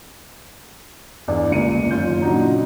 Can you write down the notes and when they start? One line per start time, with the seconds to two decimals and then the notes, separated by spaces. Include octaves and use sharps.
1.28 E2 G2 D5
1.50 G1 C#2 C#3 A#3 C#7 D#7
1.91 F#1 D#3 C#4 F4 G6
2.22 A#2 C#3 F#3 D4 D#4